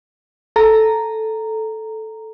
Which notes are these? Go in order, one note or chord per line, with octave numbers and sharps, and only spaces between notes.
A4 A#5